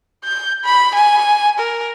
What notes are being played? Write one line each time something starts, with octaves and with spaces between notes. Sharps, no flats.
G6
B5
G#5
A#4